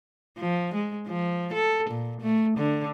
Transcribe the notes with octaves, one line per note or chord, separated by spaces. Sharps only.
F3
G#3
F3
A4
A#2
A3
D3